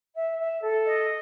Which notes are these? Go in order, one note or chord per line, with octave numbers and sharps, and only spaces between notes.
E5
E5
A4
D#5